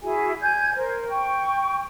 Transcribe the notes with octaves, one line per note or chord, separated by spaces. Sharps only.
E4 F#4 G#4 G#5
D5 G#5 G6 G#6
A#4 C5
G5 C#6